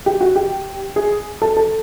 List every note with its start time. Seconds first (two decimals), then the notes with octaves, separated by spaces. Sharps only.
0.06 G4
0.21 F#4
0.36 G4
0.96 G#4
1.42 A4
1.57 A4